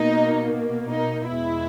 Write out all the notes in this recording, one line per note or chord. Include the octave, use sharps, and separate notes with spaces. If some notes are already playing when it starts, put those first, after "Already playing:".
Already playing: B2 A#3 D#4
D#4
E2 B2 G#3 B3 E4